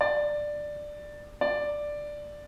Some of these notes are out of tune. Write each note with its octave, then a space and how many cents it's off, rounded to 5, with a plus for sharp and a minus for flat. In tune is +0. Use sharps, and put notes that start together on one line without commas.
D5 +10
D5 +5